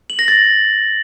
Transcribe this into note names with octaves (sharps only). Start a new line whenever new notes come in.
F#7
A#6
A6